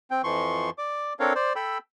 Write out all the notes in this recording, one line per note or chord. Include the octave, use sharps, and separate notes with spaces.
C4 G5
F2 E3 F3 C6 C#6
D5 D6
C4 D4 A4 A#4 C#5 F5
C5 D5
A4 G5 B5 E6